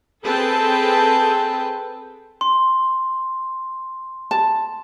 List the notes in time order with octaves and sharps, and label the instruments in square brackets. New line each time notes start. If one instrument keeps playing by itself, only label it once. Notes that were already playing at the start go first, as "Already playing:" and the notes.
[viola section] C4 G#4 A4 B4 G5 A5
[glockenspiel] C6
[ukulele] A5